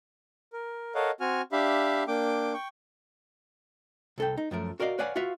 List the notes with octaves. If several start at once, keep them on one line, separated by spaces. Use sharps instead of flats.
A#4
A4 A#4 C#5 D#5 F5 F#5
C4 F#4 G#5 F6
D4 G4 E5 F5 B5
A#3 D4 G5 D6
G5 C#6
C2 A4 G5
D#4
F#2 F3 A3 A#4
F#4 A#4 D5 D#5 F5
B4 C#5 D5 F5 F#5 G#5
F4 F#4 B4 E5 F5